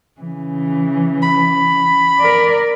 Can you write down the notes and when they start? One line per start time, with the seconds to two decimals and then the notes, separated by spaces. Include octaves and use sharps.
0.21 C#3 E3
1.23 B5
2.19 A#4 D5